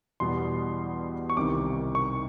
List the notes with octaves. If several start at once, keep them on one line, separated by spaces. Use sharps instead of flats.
E2 B2 G3 B3 C6
C#6
C2 C3 D#3 D6
C#6